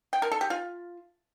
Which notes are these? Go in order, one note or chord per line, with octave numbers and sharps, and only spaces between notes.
G5
A#4
A4
G4
F4